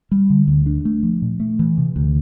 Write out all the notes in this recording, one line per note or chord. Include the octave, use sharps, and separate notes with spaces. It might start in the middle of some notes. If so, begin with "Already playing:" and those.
G3
D3
D2
D4
A3
F3
A#2
A3
E3
C3
D2